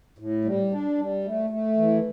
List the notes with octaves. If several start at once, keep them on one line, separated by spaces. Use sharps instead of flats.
A2
G3
D4
G3
A3
A3
E3